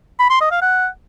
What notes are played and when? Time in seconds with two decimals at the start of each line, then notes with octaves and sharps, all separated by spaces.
0.20 B5
0.30 C6
0.41 D#5
0.51 F5
0.62 F#5